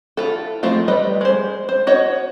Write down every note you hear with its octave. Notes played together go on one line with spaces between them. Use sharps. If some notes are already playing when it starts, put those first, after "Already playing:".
E4 F4 A4
F3 G#3 A3 C4 F4
G3 B4 D#5
G#3 C5
C5
F#4 C#5 D#5